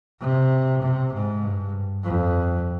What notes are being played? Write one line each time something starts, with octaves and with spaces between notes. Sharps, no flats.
C3
C3
G#2
G2
F2